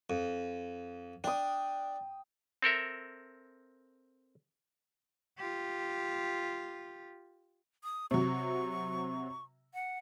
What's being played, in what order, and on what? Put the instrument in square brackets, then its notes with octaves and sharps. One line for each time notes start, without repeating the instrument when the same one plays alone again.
[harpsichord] F2
[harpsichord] D4 [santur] G5 D#6
[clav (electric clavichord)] C4 A4 A#4 E5
[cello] F4 G4
[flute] D#6
[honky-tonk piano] C3 F#3 [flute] C#6
[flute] F#5